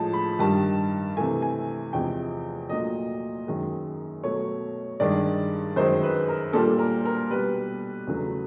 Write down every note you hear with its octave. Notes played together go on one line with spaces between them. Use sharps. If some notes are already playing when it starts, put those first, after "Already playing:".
Already playing: A2 F3 G#3 A5
B5
G2 D#3 G3 A5
C3 E3 A3 G#5
G#5
E2 C3 F3 G#3 G5
A#2 F#3 A3 D#5
F#2 D#3 G#3
B2 F#3 A3 C#5
G2 D#3 G#3 D5
F#2 D#3 G#3 C5
B4
A#4
A#2 G3 A4
A#4
A#4
B2 G3 B4
E2 C#3 F#3 A3